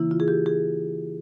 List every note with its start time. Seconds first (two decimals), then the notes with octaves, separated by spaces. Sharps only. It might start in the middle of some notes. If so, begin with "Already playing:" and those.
Already playing: C#3 E3 A#3 E4
0.11 F4
0.20 G#4
0.28 G4
0.46 G#4